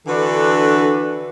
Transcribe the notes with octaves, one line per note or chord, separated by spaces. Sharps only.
D3 E3 D4 F#4 A4 B4